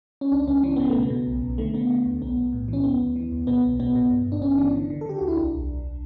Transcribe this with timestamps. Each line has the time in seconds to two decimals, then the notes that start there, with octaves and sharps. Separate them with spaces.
0.21 C#4
0.32 C#2 D4
0.47 C#2 C#4
0.63 E3 C#4
0.76 C#3 B3
0.90 A3
0.95 B2
1.03 B3
1.10 B2
1.27 B1
1.42 B1
1.58 D3 A3
1.74 D3 B3
1.89 D3
2.05 D2
2.22 B1 B3
2.37 B1
2.53 A2
2.68 E3 C#4
2.84 D2 B3
3.00 D2
3.16 E3
3.32 D2
3.47 B2 B3
3.63 B1
3.80 B2 B3
3.95 B2
4.10 G2
4.27 G1
4.32 D4
4.42 G1 C#4
4.58 E3 D4
4.74 D3
4.90 D3
5.01 A4
5.06 D3 G4
5.18 D2 F#4
5.28 E4
5.36 B1 D4
5.52 B1
5.68 B1